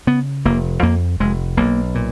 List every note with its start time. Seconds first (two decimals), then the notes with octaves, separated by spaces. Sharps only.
0.07 C#3 B3
0.45 F1 A#3
0.83 F2 A#3
1.20 F1 G#3
1.57 B1 A#3
1.95 A#2